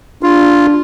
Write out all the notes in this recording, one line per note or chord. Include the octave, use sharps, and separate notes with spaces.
D4 F4